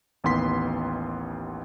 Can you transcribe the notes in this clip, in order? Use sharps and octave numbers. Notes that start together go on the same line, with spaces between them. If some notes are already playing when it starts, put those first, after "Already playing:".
A1 D#2 B3 C6 B6